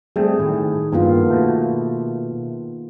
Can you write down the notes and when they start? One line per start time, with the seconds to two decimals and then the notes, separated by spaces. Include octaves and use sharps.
0.16 G3 A3 C4 G#4
0.39 A2 D#3
0.92 G2 A#3 B3 F4
1.30 B2 A3